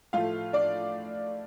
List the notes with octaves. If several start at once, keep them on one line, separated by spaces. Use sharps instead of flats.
A2 F3 A3 F4 F5
D4 D5